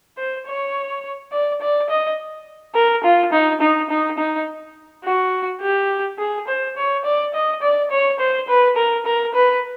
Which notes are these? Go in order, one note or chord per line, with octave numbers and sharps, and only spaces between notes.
C5
C#5
D5
D5
D#5
A#4
F4
D#4
D#4
D#4
D#4
F#4
G4
G#4
C5
C#5
D5
D#5
D5
C#5
C5
B4
A#4
A#4
B4